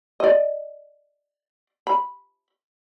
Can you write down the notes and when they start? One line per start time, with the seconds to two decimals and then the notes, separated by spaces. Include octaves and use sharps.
0.20 D5 D#5
1.87 B5